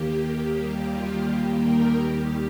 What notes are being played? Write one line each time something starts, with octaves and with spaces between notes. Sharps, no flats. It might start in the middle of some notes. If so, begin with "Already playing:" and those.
Already playing: D#2 D#3 A#3 G4
G4
D#2 D#3 G3 A#3
F4
D#2 D#3 G3 A#3 G4
A#4
D#2 D#3 G3 G4